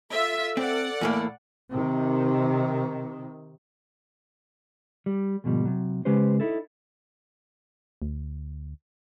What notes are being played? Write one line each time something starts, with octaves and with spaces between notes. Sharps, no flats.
F4 A4 E5
C4 D5 F#5
E2 A2 A#3
C3 D#3
G3
D2 G#2 B2 F3 G3
C3 F#3
C#3 G#3 C#4 G4 B4 C5
D#4 E4 A4
D2